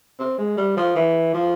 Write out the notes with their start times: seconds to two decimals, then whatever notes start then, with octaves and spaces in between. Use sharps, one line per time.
0.19 C4
0.39 G#3
0.58 G3
0.77 F3
0.96 E3
1.34 F3